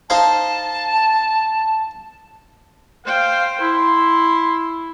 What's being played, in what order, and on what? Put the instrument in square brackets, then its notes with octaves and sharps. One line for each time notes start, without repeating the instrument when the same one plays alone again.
[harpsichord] D#4 C5 F5 [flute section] A5
[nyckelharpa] C5 G5 [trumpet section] F5
[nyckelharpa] E4 [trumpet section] B5 C6